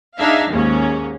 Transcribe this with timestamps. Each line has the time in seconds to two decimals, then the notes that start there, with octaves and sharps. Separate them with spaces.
0.18 D4 D#4 G#4 E5 F5
0.50 D#2 G#2 A#3 C#4